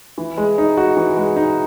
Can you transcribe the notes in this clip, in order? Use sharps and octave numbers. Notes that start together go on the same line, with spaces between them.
E3
G#3
D#4
F#4
E3
G#3
D#4